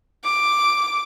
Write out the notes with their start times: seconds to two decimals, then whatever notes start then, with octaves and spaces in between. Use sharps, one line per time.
0.24 D6